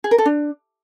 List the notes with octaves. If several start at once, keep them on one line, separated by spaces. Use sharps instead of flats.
G#4
A#4
A4
D4